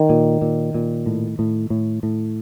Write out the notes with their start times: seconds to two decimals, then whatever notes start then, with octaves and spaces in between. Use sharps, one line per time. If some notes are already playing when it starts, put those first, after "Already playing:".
Already playing: D#3
0.09 A#2
0.42 A#2
0.75 A#2
1.06 A2
1.39 A2
1.70 A2
2.03 A2